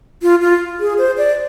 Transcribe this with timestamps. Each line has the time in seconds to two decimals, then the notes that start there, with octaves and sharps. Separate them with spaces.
0.22 F4
0.41 F4
0.80 G#4
0.98 C5
1.18 D5